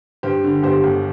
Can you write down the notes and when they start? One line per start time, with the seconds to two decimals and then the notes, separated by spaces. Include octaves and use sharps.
0.23 G2 G4 C5
0.44 D3
0.63 G1 G4 C5
0.84 G1